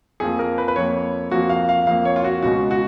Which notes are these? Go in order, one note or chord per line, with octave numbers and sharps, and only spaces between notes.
F2 F3 A#3 G#4
A#4
B4
B4
F2 F3 A#3 C#5
F2 F3 A#3 F#4
F5
F5
F2 F3 A#3 F5
C#5
F4
F#4
C#2 B2 G#3 F#4
F#4